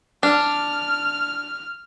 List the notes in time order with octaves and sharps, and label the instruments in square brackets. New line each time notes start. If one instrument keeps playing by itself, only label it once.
[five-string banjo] D4 [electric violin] F6